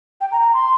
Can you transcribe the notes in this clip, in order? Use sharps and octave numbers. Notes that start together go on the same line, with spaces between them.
G5
A#5
A#5
C6